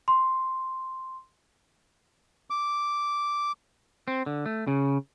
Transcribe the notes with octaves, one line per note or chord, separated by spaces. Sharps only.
C6
D6
C4
D3
A3
C#3